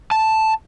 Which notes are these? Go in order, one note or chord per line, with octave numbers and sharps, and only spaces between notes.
A5